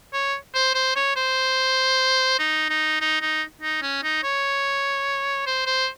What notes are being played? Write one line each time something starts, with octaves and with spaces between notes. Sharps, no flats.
C#5
C5
C5
C#5
C5
D#4
D#4
D#4
D#4
D#4
C#4
D#4
C#5
C5
C5